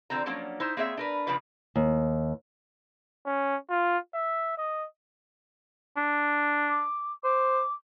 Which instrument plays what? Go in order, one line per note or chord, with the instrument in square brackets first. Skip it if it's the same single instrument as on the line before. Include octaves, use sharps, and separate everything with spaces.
[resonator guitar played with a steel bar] D3 F3 C4 A#5
F3 F#3 A#3 C#4 D4
D#4 E4 C5
A#3 C4 G#4 C#5 D#5 E5
D4 A#4 B4
C#3 F3 D4 F4 B4
[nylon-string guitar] D#2
[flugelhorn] C#4
F4
E5
D#5
[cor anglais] D4
[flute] D6
[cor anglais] C5 [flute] D6